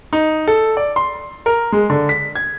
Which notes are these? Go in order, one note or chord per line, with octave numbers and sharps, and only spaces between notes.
D#4
A4
D5
C6
A#4
G#3
D3
B6
G#6